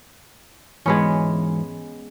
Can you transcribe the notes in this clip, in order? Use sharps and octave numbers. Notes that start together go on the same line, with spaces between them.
E2 G#2 E3 G#3 B3 C#4